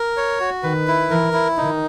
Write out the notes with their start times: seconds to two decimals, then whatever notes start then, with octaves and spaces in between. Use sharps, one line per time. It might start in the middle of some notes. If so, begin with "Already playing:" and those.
Already playing: A#4
0.17 C#5
0.40 F#4
0.63 D#3 B4
0.88 E4
1.11 E3 A#4
1.33 E4
1.57 D#3 D#4